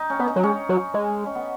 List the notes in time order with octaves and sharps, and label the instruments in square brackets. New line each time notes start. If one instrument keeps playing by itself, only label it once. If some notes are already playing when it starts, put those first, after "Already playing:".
Already playing: [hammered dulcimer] D#4
C#4
[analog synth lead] B3
[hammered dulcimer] D#4
[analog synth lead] F#3
[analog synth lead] G#3 [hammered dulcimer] C#4
[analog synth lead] F#3
G#3
[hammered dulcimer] C#4
B3